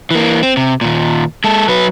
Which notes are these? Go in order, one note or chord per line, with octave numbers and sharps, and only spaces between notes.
E3 A#3
C4
C3
D#2 A#2
G#3 A4
F#3 B4